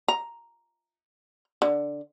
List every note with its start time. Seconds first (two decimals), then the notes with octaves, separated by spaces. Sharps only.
0.08 A#5
1.62 D3